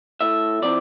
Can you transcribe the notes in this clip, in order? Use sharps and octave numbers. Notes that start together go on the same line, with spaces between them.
A2 E5
F3 C4 E4 D5